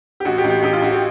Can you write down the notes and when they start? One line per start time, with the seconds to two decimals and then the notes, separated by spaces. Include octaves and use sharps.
0.20 G4
0.25 A1 F#4
0.38 G4
0.44 A1
0.50 G4
0.62 A1 G4
0.73 F4
0.82 A1 F#4
0.92 G4